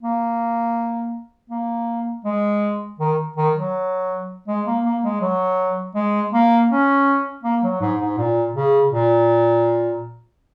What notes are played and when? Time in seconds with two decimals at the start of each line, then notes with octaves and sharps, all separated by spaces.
0.03 A#3
1.50 A#3
2.25 G#3
2.99 D#3
3.37 D#3
3.55 F#3
4.48 G#3
4.66 A#3
4.84 A#3
5.03 G#3
5.21 F#3
5.95 G#3
6.33 A#3
6.70 C#4
7.43 A#3
7.63 F#3
7.81 G#2
8.00 G#2
8.18 A#2
8.55 C#3
8.92 A#2